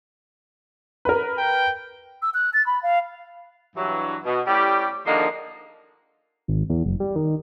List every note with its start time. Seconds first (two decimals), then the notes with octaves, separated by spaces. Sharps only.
1.05 A#4 B4
1.38 G5
2.22 E6
2.34 F#6
2.53 A6
2.66 B5
2.83 F5
3.76 G2 E3 F#3
4.25 B2
4.47 A2 G3 C#4 G4
5.06 G#2 D3 D#3 F3 A#3 D#4
6.48 G#1
6.70 E2
6.86 F#1
7.00 G3
7.16 D#3